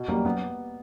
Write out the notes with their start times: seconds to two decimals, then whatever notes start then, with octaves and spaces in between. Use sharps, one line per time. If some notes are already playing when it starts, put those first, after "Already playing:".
Already playing: B2
0.08 F#2 G3 A#3
0.25 F#2 B3